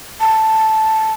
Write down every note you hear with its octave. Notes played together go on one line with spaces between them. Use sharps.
A5